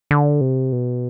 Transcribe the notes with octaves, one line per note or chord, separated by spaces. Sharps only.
D3
C3
B2